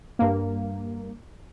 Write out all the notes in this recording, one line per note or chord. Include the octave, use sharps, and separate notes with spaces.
G2 A#3